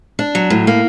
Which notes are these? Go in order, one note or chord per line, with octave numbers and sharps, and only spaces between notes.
D4
F#3
A2
A#3